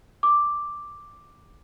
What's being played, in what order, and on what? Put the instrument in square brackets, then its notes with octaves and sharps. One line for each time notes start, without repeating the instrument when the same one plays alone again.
[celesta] D6